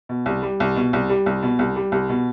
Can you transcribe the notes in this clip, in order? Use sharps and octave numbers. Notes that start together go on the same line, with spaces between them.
B2
C2
G3
C2
B2
C2
G3
C2
B2
C2
G3
C2
B2